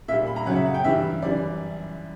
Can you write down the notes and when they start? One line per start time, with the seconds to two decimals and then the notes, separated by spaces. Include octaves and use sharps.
0.08 A#2 E5
0.12 G3
0.27 B5
0.36 A#5
0.46 F#2 C#3 F#3 F#5
0.56 E5
0.65 F#5
0.74 G5
0.84 G2 E3 G3 E5
1.22 F#2 E3 G3 D5